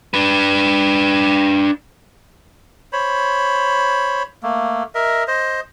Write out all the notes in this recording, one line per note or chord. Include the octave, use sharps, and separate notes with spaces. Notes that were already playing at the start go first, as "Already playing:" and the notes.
D4 B4
C5 C#5 B5
A3 A#3
A#4 D#5 E5
C5 D#5